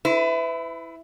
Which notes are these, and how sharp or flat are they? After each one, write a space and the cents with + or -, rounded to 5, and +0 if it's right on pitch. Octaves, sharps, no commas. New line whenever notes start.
E4 +0 B4 +35